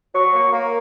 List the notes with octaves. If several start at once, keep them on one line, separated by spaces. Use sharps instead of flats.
F#3 C#6
A#3
A#3